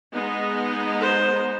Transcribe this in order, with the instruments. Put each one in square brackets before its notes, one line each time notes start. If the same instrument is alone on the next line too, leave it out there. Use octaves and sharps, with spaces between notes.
[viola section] G#3 B3 D#4
[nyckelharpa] C5